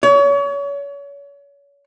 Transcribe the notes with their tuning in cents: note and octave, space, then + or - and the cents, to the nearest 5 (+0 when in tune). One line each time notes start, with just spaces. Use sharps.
C#5 +35